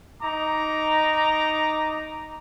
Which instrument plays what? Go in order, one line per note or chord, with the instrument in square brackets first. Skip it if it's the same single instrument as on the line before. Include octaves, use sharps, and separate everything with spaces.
[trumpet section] D#4 A#5 D6